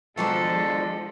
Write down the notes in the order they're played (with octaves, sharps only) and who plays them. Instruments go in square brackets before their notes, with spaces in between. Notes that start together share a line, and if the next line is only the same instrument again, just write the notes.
[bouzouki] B2 D#3 D4 [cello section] F3 G#3 [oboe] A4